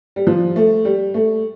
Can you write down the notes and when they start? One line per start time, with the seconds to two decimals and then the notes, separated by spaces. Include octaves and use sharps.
0.16 G3
0.27 F3
0.56 A3
0.85 G3
1.14 A3